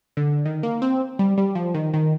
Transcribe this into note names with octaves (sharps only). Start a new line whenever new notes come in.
D3
D#3
A#3
C4
G3
G3
F3
D#3
D#3